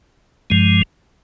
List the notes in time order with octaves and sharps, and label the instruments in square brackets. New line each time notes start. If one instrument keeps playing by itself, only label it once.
[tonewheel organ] G2 F3 G#3